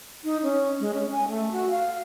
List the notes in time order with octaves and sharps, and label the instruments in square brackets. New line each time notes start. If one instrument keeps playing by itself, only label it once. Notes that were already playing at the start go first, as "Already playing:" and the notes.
[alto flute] D#4
C#4
G#3
C#4
G#5
A3
F#4
F5